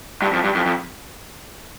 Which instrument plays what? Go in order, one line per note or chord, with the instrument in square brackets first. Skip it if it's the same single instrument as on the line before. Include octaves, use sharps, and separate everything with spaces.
[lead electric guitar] G2
F2
G2
F2
F2